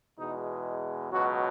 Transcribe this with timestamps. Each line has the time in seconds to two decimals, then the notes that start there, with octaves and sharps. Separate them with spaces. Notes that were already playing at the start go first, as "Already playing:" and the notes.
0.18 E2 B2 G#3 D#4
1.11 C#2 B2 F#3 F#4